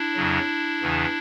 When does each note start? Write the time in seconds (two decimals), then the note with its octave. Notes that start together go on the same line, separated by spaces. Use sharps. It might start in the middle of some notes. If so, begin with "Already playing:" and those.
Already playing: D4 E4
0.16 F2 C#3 F#3
0.82 E2 C#3 E3